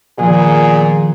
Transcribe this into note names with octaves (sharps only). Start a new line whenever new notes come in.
A#2 D#3 F3 B3 G#4